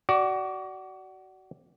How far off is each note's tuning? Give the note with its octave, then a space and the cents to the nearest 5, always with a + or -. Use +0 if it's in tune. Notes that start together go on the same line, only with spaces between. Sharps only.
F#4 +25 D5 +0